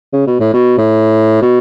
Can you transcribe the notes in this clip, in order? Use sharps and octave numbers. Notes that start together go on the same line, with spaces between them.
C#3
B2
A2
B2
A2
B2